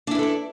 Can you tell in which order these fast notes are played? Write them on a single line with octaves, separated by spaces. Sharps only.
D4 E4 B4 A4 D5